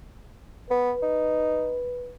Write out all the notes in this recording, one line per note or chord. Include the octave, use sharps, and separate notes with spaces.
B3 B4
D#4